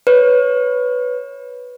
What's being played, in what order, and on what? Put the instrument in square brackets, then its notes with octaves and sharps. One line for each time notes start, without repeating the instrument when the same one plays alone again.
[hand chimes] B4 C#5